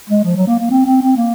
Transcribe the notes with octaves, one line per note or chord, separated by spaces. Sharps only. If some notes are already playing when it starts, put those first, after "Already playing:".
G#3
F3
F#3
A#3
A#3
C4
C4
C4
A#3